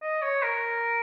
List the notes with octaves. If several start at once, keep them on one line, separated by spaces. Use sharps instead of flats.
D#5
C#5
A#4